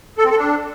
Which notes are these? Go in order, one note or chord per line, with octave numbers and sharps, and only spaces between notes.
A4
C4
A4
D4